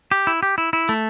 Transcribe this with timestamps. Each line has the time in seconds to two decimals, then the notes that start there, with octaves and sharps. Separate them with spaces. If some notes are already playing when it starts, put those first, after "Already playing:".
0.12 G4
0.27 E4
0.43 G4
0.58 E4
0.73 E4
0.89 A3